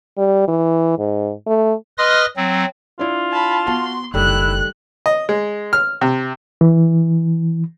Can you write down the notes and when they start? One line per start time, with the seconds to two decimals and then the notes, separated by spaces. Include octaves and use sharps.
0.18 G3
0.48 E3
0.99 G#2
1.47 A3
1.98 B4 D#5 C6 D#6 F6 A#6
2.37 F#3 C4
2.99 D4 E4 F4
3.32 A5 B5
3.67 B3 F#4 A5 C6
4.14 F#1 D#3 G3 A3 E4 F#6
5.06 D#5
5.29 G#3
5.73 F6
6.01 C3
6.61 E3